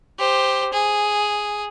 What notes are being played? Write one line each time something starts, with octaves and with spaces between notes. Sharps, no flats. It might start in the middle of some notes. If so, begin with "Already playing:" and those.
G4 C5
G#4